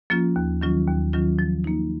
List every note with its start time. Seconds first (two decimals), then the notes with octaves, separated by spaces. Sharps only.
0.10 F3 A#3 C#4 F4
0.36 D#2
0.61 D#3 F#3 C#4 F4
0.87 D#2
1.13 D#3 F#3 C#4 F4
1.39 F3
1.64 A#3 D#4